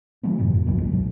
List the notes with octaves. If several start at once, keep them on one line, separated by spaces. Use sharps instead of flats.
D#3 F#3 A3 C4
F#2 A2 C3 E3
F2
B1 D3 F#3 A#3
C2 G2 D3 G#3
B2 F#3